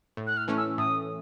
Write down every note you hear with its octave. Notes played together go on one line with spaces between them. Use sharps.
A2
F#6
F6
E3 A3 C#4
E6
A2 D#6